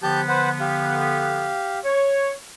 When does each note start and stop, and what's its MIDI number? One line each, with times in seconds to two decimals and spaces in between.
0.03 1.54 50
0.03 1.54 53
0.03 1.54 59
0.03 0.21 67
0.03 0.21 81
0.03 0.21 91
0.28 0.49 71
0.28 0.49 72
0.28 0.49 78
0.60 1.79 67
0.60 1.79 77
1.85 2.31 73